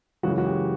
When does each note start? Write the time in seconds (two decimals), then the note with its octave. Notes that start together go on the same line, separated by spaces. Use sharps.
0.23 F#2 C#3 E3 G#3 F#4
0.38 F#4
0.46 G4